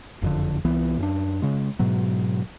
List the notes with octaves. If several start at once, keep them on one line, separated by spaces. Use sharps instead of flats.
F#1 F2 D3
C2 E3 B3
F#2 C#4 D4
C#3 G#3
G#2 B2 F#3